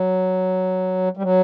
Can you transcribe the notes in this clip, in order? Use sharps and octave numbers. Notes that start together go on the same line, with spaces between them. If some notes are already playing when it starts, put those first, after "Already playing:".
Already playing: F#3
G3
F#3